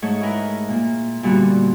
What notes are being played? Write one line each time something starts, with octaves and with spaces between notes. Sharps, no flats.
G#2 A3 C#5
E4 G#4 A#4 B4
A#2 A#3
A#2 D3 G3 B3 F#4